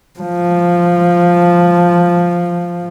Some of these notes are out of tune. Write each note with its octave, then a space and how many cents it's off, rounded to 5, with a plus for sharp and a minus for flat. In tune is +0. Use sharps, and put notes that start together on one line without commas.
F3 +0